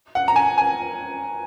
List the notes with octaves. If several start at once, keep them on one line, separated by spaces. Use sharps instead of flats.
F#5
A#5
G#5
G#5